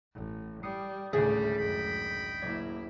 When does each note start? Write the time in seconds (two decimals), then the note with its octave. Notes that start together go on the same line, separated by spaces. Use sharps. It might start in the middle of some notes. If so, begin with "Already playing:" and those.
0.14 A1
0.63 G3 D#6 C7 C#7
1.13 G#1 D2 A2 C#3 G3 A3 G#4
1.58 F#2 D#5 G5 B5
2.42 F#1 A#3 E4 D5 G#6